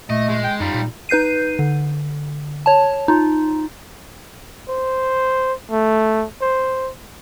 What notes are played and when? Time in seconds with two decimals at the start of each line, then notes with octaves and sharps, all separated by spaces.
0.10 A#2 A3 D#5
0.29 G#3
0.44 G5
0.60 F#2 G3 D#4 F4
0.74 A#2
1.09 D#4 B4 G6 C7 D#7
1.59 D3
2.66 C#5 A5
3.08 D#4 F4
4.69 C5
5.71 A3
6.41 C5